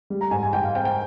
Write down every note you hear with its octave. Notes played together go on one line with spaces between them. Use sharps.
G3
A#5
G#2 G#5
G#5
G#2 G5
F5
C4 G5
G5